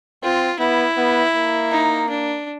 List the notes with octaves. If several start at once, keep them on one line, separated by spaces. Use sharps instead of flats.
C4 F4
B3 E4
B3
A#3
D#4
D4